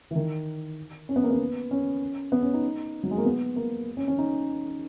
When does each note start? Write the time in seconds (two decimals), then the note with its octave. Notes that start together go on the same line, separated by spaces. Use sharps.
0.11 E3
0.16 D#3
1.09 C#4
1.16 B3
1.23 A#3
1.31 B3
1.71 C#4
2.32 B3
2.43 C#4
2.54 D#4
3.03 F#3
3.11 G#3
3.18 A#3
3.25 B3
3.56 A#3
3.97 C#4
4.08 C#4
4.18 D#4